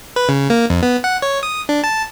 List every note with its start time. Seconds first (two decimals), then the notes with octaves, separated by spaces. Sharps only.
0.16 B4
0.29 C#3
0.50 A#3
0.70 F2
0.83 B3
1.04 F#5
1.22 C#5
1.43 D#6
1.69 D4
1.84 A5